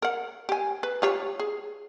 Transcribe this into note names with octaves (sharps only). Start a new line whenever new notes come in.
A#4 F#5
G4 G#5
B4
F4 G4 C#5
G#4